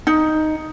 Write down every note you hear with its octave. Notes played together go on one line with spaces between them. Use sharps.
D#4